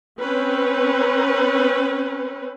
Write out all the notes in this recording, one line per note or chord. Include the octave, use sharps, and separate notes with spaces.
C4 C#4 B4